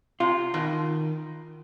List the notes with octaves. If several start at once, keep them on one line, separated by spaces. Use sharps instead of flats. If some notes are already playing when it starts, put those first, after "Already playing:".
C3 F4
B2 D#3